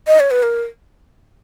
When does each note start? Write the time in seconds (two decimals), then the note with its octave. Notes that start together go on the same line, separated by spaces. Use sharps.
0.07 D#5
0.20 C#5
0.31 B4
0.43 A#4